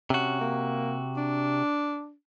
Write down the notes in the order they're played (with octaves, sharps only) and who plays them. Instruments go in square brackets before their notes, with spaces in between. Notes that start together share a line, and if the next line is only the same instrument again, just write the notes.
[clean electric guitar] C3 F#4 [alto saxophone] C#4
[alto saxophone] A#3
D4